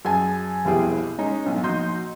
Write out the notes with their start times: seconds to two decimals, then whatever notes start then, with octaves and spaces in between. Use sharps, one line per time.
0.05 F#2 G#4 G#5 A5
0.65 F1 C2 B2 E4 G4 G#4
1.18 G#3 C#4 D#4
1.46 B1 G#2
1.63 A#1 D#4 F#4 D#5 C6 G6